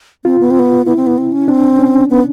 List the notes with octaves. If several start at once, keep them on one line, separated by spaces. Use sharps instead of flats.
C4 F4
B3
C4
B3
B3 E4
C4
B3
C4
C#4
C4 D4
C#4
B3